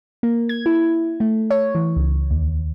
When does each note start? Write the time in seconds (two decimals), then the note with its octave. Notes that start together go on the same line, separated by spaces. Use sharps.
0.23 A#3
0.49 G#6
0.66 E4
1.20 A3
1.51 C#5
1.75 E3
1.96 C#2
2.31 D#2